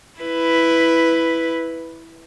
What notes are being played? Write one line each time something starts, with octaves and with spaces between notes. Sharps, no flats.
E4 B4